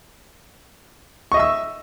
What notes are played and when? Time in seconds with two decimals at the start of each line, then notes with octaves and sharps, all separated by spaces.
1.32 C#6
1.34 D#5
1.37 E5
1.40 E6